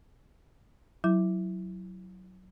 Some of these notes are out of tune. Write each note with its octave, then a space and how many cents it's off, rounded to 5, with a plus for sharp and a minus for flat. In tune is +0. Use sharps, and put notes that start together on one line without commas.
F#3 +0 E4 +0